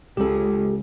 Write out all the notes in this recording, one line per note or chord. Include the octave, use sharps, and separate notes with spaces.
C#2 G4 A4